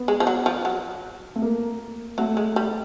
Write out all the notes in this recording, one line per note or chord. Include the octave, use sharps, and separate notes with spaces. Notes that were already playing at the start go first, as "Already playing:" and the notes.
Already playing: B3
G#3
F3
F#3
F3
F#3
A3
A#3
F#3 A3
G#3
G3